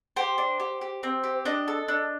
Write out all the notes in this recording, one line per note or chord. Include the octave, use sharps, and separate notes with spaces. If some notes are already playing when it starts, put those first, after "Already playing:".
G4 C5
D4
G4
G4
C4
G4
D4 D#5
A4
D4